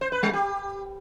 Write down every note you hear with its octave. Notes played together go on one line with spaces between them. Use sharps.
C5
B4
G3
G4